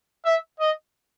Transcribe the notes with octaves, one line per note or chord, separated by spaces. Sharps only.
E5
D#5